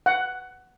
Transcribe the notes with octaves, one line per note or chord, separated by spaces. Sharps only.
F#5